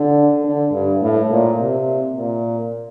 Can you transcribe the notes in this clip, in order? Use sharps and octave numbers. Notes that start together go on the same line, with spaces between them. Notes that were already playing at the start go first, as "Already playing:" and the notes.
Already playing: D3
D3
G2
A2
A#2
C3
A#2